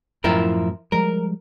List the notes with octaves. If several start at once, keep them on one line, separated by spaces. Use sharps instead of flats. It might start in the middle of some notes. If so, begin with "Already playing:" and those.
F#2 A2 F3 E4 A#4
F3 G3 G#3 A#4